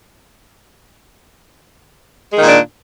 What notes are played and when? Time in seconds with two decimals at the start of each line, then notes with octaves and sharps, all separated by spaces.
2.32 G#3
2.37 D#3
2.42 A#2
2.46 D4